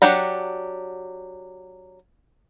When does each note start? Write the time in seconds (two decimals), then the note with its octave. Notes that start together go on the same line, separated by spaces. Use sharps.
0.02 F#3 D4 G4 F#5 A#5